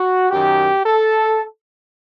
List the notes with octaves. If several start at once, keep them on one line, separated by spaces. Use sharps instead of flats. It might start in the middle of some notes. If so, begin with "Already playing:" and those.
Already playing: F#4
F#2 D#3 G4
A4